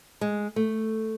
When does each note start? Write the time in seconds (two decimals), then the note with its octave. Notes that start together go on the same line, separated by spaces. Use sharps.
0.21 G#3
0.56 A3